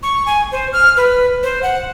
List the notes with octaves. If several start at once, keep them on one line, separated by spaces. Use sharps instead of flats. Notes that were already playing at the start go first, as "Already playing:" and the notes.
C#6
G#5
C5
F6
B4
C5
F#5